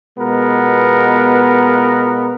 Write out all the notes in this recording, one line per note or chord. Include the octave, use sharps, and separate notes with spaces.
B2 G#3 B3 F4 A#4